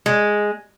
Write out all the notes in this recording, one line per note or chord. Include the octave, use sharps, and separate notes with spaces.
G#3